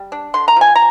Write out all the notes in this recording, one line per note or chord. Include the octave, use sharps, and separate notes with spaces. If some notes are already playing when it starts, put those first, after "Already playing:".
Already playing: G3
D4
D3 C6
A#5
F3 G#5
A#5